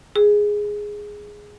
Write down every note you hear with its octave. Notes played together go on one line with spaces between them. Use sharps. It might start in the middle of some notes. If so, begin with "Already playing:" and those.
G#4